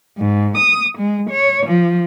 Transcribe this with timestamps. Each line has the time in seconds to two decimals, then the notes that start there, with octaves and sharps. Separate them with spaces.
0.18 G#2
0.58 D#6
0.98 G#3
1.30 C#5
1.66 F3